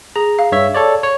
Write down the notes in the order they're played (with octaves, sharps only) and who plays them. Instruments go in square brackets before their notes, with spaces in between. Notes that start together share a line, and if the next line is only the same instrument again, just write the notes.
[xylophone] G#4 [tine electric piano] A#5
[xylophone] F5
[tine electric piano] G2 C#5 E5
A4 C#5 D5
C#5